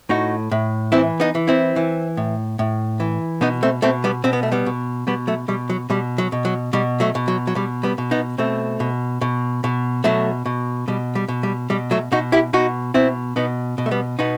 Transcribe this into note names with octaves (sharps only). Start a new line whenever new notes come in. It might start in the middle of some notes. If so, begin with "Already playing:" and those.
A2 D#4 F#4
A2
E3 C4 E4
B3 D#4
E3
C4 E4
E3
A2
A2
E3
B2 B3 D#4
A3 C4
B2 A3 C4
G3 B3
B2 C4
B3
A3
G3 B3
B2
B2 G3 B3
F#3 A3
B2 G3
F#3
B2 G3
F#3
B2
F#3
B2 G3
F#3 A3
B2
F#3
F#3
B2 G3
G3 B3
B2
B3 D#4
B2 A3 C4
B2
B2
B2
B2 F#3 A3
B2
B2 G3
G3
B2
G3
B2 G3
F#3 A3
B2 D#4 F#4
E4 G4
B2 D#4 F#4
B2 C4 E4
B2 B3 D#4
B2
A3
G3 B3
B2 B3 D#4